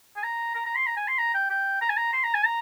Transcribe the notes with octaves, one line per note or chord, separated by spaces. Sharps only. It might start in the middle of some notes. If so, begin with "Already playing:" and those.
G#5
A#5
A#5
A#5
C6
A#5
G#5
C6
A#5
G5
G5
A#5
G#5
A#5
C6
A#5
G#5
A#5